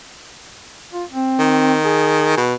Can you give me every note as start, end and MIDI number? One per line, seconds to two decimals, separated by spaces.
0.93 1.04 65
1.11 1.78 60
1.39 2.32 51
1.85 2.40 68
2.37 2.55 47